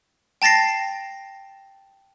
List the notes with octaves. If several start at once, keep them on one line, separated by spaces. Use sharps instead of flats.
G5 A5 A6 A#6 C7